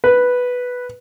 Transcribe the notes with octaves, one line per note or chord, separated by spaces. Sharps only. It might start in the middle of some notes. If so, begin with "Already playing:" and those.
B4